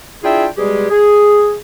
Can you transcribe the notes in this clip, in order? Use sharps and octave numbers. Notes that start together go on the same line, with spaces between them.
D4 E4 F4 G#4 E5 G5
B2 G3 G#3 G4 G#4
G#4